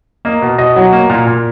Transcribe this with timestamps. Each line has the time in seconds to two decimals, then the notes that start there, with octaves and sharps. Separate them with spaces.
0.25 A#3 D#5
0.42 B2
0.58 B2 D#5
0.76 F#3 F#5
0.92 A#3
1.10 A#2
1.27 A#2